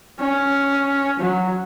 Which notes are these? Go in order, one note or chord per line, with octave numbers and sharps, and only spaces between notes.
C#4
F#3